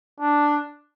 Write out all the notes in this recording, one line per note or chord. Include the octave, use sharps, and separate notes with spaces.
D4